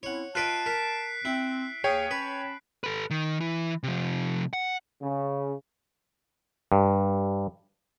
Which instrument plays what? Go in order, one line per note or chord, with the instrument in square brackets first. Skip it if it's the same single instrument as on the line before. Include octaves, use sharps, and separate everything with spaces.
[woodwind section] C4 C#4 E4 [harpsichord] C#5 F#5
[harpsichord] F4 B4 D#5 [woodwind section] A5 [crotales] F#6 C7 D7
[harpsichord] A#4 [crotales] B6
[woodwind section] C4 [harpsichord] E4
[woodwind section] D#2 F5 D#6 [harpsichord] G#4 [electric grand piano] C#5 G5
[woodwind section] C#4 A5 B5 [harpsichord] B4
[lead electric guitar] A4 B4
D#3
E3
C3 F3
F#5
[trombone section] C#3
[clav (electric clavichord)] G2